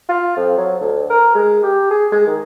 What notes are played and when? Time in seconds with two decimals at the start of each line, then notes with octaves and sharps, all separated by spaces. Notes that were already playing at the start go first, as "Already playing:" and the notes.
0.09 F4
0.37 F2
0.58 F#3
0.81 D2
1.10 A#4
1.35 G#3
1.63 G4
1.91 G#4
2.12 G#3
2.27 D#3